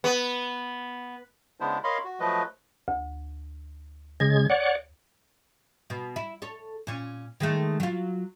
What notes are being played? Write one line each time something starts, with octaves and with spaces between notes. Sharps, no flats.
B3
C#3 G#3 B3 D4 E4 C5
A#4 C#5 D#5 F5 B5 C6
F#4
F3 F#3 A3 B4 D#5
D2
C#3 G#3 G#6 A#6
C#5 D5 F#5
B2
E4
A4 C#5
A#2 C#4
D#3 G#3 A3
F#3 F4